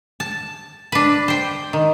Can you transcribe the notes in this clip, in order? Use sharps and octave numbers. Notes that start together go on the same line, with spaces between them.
A5
D4 B4
C5 G5
D#3